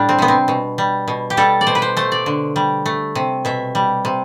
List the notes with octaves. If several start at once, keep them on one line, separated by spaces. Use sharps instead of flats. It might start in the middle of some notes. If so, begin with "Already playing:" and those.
Already playing: A2 G3 D4
C4
C3 B3
C4
B2
G3
B2
G4
G3 A4
D5
B2 C5
B4
C5
A3 C5
D5
D3
G3
A3
C3
B2 E5
G3
C3